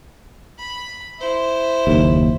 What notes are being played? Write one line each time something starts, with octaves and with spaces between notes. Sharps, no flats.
B5
E4 C5
F#1 D#2